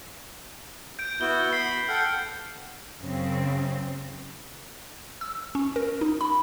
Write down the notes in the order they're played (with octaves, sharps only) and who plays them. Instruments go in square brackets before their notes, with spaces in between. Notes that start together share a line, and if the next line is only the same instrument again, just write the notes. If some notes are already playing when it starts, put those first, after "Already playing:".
[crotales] G6 D7
[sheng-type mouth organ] B3 E4 F#4 [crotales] G6 G7
[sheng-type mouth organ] B5 [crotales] C7
[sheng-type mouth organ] A4 F#5 G5 [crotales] F6
[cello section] F#2 C#3 C4
[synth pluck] E6
C#4
A#4
D#4
B5